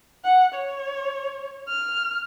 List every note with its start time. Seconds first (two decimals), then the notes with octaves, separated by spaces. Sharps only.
0.24 F#5
0.54 C#5
1.68 F6